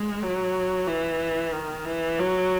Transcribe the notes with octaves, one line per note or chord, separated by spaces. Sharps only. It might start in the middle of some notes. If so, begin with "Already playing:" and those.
Already playing: G#3
F#3
E3
D#3
E3
F#3